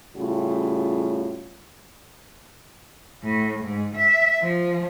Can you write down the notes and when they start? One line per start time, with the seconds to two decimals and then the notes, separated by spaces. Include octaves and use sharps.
0.17 A2 C#3 G3 F4 F#4
3.24 A2
3.65 G#2
3.96 E5
4.41 F3